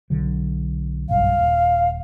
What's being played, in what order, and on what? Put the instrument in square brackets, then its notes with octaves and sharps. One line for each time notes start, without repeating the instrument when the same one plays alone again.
[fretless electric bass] B1 D3 F#3
[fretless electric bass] F#1 B1 G2 [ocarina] F5
[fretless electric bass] D#1